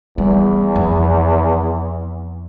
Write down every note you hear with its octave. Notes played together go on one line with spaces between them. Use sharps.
E2 G3
F2